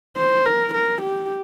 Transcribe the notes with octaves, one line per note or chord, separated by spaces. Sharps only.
C5
A#4
A#4
G4